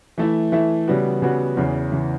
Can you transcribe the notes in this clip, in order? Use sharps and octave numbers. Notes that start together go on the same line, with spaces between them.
E3 A3 E4
E3 A3 E4
C#3 G3 B3 F#4
C#3 G3 B3 F#4
E2 C#3 E3
C#3 E3